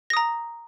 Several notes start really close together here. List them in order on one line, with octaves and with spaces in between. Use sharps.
A#6 D#6 A#5